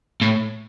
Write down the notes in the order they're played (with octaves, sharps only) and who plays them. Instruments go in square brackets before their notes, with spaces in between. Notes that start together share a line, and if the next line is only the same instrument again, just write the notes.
[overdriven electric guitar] A2